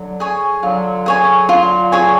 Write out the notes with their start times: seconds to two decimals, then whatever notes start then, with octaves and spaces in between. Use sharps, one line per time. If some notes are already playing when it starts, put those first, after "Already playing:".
Already playing: D3 F#3
0.20 G#4 C#5 G#5
0.62 D3 F#3 F4
1.06 G#4 C#5 G#5
1.49 F4
1.92 G#4 C#5 G#5